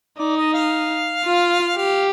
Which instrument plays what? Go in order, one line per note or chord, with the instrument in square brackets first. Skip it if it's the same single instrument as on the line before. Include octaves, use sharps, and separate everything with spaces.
[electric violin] D#4 [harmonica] D5
[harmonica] D#5
F5
[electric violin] F4
[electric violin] G4 [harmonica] F5